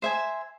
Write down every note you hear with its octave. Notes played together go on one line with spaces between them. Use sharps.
C5 E5 G#5